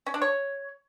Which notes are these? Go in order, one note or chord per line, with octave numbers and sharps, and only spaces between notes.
C#4
D4
C#5